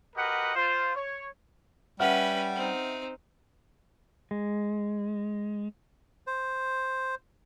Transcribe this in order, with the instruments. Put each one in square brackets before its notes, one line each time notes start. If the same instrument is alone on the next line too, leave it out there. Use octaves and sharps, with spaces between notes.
[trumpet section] F#4 G4 A#4 B4 D#5 F#5
F4 C5
C#5
[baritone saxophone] G3 [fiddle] C#4 B4 [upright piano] E5 F#5 F6
[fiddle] C4 D#4
[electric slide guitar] G#3
[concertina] C5